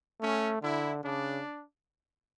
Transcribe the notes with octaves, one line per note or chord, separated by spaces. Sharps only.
A3 C#4
D3 E4
C#3 D4